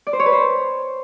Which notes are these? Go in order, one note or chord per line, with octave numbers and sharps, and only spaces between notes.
D5
C5
C#5
B4
C5